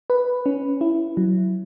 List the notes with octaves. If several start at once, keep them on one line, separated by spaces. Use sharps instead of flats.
B4
C#4
E4
F#3